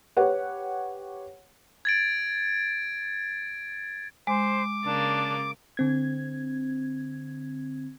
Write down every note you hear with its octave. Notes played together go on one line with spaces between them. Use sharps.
G4 B4 C#5 F#5
G#6 A6 D7
G#3 C5 D6
C#3 A#3 D4 A6
D3 C4 G#6